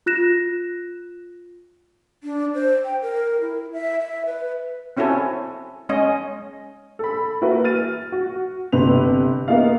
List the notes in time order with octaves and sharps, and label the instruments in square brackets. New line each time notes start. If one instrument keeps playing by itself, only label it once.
[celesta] F4 F#6 A#6 E7
[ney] D4
C5
G5
A#4
E4
E5
E5
B4
[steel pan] C4 C#4 E4 F#4 A4 G#5
G#3 C#4 D#5
[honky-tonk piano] A4 B5
A#3 E4 F#4 B4
F6 A6 D#7
F#4
G1 C3 B4 F7
A#3 B3 E4 D#5 F5